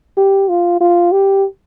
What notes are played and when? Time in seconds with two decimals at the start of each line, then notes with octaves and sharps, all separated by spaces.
0.17 G4
0.49 F4
0.81 F4
1.12 G4